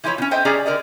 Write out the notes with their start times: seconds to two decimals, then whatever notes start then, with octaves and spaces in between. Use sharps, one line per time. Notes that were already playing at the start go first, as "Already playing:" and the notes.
0.04 E3 F3 E4 B4 C#5
0.18 B2 C#4
0.31 A4 C5 D#5 E5 G5
0.45 C#4 G4 G#4 D5 G#5 A#5
0.65 D3 A#4 D5 D#5